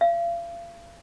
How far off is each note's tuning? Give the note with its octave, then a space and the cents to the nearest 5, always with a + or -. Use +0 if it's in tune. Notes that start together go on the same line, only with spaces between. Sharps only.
F5 -35